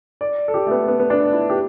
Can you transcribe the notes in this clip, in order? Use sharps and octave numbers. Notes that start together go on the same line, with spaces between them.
D5
A4
G4
A3
B3
B3
B3
D4
E4
G4